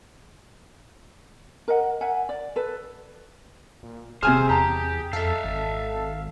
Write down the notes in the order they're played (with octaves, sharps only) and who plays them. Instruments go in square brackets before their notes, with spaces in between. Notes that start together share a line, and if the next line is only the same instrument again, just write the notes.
[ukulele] A#4 D#5 F#5
A#4 E5 F#5 G#5
D5
A4 B4
[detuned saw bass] A#2
[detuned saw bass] D#1 [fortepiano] C3 G#5 F6 [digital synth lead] G#4 [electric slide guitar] C5
[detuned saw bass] E2 [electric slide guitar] G4 [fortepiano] A5 A#5
[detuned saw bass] F2 [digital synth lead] A4 [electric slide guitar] E5 F5
[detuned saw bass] G#1